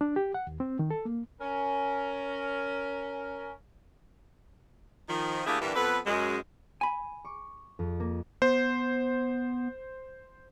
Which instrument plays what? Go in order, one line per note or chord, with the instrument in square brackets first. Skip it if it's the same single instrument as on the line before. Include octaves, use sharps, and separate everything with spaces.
[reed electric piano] D4
G4
F#5
D#2
C4
D#3
A4
A#3
[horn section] C#4 A#4
[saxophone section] D#3 F3
D3 A3 A#3 E4 G4 G#4
G2 D3 E3 G3 A#3 D4
F2 B3 A4 B4
F#2 G#3
[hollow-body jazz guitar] G#5 B5
[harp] C#6 D6
F2
A#3
[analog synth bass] B3 [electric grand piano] C5